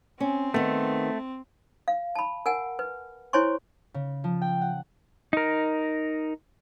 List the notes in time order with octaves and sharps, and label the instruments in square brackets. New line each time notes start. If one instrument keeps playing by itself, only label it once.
[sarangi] C4 [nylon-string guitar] C#4
[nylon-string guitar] D#3 B3 [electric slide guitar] A3
[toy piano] F5
A5 B5
A#4 F#5 G#5
B4
E4 C5 C#5 G#5 C6 C#6
[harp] C#3
F3
G5
F#5
[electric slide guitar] D#4 A#4